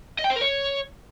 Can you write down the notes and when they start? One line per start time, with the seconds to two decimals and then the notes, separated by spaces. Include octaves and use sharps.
0.19 D#5
0.24 G5
0.30 C5
0.36 A#4
0.41 C#5